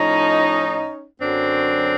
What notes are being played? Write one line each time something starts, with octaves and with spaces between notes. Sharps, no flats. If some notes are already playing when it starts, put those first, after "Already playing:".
Already playing: A2 F3 C#4 D#4
F#2 D3 F#3 C4 D4